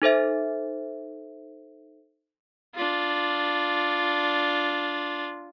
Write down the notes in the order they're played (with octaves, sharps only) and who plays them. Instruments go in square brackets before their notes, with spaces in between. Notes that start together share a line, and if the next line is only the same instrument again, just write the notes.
[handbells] D#4 A4 C5 E5
[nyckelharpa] D4 F4